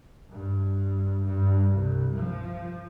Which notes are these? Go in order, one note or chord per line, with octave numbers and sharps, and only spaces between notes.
G2
G2
C2
F3